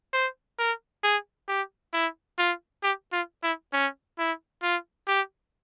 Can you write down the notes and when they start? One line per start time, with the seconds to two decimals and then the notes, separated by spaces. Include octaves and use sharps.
0.13 C5
0.59 A#4
1.03 G#4
1.48 G4
1.93 E4
2.38 F4
2.83 G4
3.12 F4
3.43 E4
3.73 C#4
4.18 E4
4.63 F4
5.07 G4